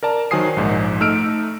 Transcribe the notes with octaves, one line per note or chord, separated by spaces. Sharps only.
A#4 D5 A5 A#5
D#3 F#3 C5 G#5 D#6 C7
A#1 G#2
A3 D#4 E6 F6 D7